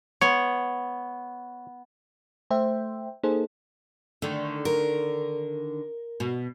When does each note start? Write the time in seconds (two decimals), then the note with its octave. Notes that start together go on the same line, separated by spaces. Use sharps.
0.22 B3 C#5 C6
2.51 A3 C5 E5 G5
3.23 A#3 D#4 G#4 A4 C5 D#5
4.22 D3 D#3 A3
4.65 A#4
6.20 B2